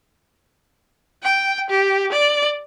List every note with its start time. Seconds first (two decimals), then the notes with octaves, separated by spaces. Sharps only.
1.23 G5
1.70 G4
2.12 D5